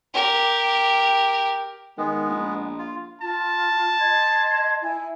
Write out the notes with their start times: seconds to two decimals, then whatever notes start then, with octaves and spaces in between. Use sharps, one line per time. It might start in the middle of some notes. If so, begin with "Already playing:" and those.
0.14 G4 A#4
1.98 D#3 G#3 B3
2.29 A#1
2.78 F4
3.21 F4 A5
4.00 D#5 C6 G#6
4.82 E4 G#5